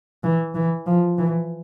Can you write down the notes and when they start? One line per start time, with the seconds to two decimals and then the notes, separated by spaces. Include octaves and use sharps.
0.24 E3
0.55 E3
0.86 F3
1.18 E3